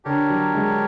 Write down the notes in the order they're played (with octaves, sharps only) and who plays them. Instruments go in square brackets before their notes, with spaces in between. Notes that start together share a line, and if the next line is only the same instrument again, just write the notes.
[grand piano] D3 [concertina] D4 G4 A#4 C#5
[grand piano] F#3
G#3